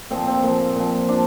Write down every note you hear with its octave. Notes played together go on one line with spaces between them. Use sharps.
A#2 F3 C4
C4
A#2 F3
A#2 F3
F3 D4